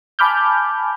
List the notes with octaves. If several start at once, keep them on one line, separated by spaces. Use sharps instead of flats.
G#5 A5 B5 D6 F6 G6